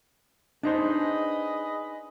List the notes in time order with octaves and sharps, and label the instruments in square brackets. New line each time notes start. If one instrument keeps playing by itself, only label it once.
[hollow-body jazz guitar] D4 D#4 C5 [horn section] G#4 B4 D#5